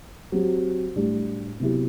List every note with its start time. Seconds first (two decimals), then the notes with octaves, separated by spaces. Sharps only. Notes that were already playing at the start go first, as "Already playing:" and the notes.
0.32 F#3 C4 G4
0.96 A2 G3 D4 G4
1.60 C3 F#3 B3 E4 G4